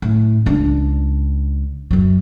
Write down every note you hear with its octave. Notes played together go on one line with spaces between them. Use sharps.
A2
C#2 D4
F#2 F#3